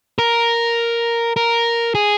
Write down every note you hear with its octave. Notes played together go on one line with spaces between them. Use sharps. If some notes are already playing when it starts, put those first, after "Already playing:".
A#4
A#4
G#4